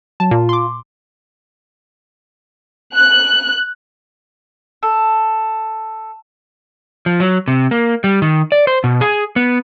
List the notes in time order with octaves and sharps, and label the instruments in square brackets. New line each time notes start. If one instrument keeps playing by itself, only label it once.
[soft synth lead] F#3 [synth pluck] A5
[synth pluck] A#2 [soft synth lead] F4
[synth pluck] C6 D6
[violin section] F#6
[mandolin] A4
[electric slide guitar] F3
F#3
C3
A#3
G3
D#3
D5
C5
B2
G#4
B3